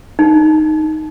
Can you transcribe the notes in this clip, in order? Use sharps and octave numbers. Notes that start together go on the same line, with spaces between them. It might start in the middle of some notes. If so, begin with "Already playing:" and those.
D#4